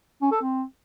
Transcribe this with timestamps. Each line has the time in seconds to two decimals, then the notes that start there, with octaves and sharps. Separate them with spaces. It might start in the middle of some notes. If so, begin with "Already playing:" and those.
0.22 C#4
0.32 A4
0.42 C4